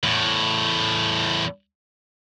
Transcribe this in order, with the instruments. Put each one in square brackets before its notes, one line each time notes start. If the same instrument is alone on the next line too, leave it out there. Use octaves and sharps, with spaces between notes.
[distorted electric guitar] E2 A2